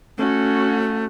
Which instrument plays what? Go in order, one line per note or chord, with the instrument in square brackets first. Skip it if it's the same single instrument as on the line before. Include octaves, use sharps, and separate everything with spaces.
[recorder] A3 [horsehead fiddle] C#4 F#4